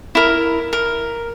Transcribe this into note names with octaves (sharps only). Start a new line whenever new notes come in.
E4 A#4
A#4